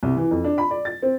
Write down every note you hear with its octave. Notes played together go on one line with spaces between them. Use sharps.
C2
E3
F2
D4
B5
D5
A6
C4